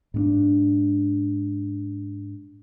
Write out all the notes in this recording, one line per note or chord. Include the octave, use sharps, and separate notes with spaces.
G#2 C4 D4